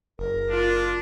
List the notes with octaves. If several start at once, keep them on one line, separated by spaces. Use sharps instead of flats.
F#1 A#4
D4 F4